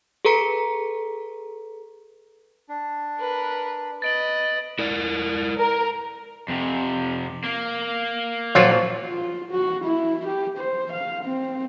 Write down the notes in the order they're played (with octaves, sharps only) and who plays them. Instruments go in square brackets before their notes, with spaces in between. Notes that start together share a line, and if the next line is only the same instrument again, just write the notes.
[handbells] G#4 A4 B4 A#5 B6 C#7
[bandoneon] D4
[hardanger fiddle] A#4 B4
[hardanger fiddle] B4 D#5 [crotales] A6 D7 F#7
[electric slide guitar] E4 A#4 D5
[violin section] A#4
[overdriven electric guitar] F2 C3
A#3
[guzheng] A#2 F3 D5 [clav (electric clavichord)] F#3 F4
[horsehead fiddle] F4
F#4
E4
G4
C5
F5
C4